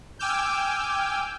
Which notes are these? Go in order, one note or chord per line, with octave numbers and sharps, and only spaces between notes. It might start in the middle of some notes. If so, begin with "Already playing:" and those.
G5 G#5 D6 E6 F6 G6